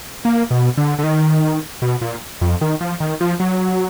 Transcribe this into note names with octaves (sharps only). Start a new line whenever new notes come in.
A#3
B2
D3
D3
D#3
B2
A#2
F2
D#3
F3
D#3
F3
F#3